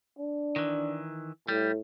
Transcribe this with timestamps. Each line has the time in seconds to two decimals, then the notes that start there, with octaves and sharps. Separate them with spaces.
0.18 D4
0.56 D#3 E3
1.48 A2 G3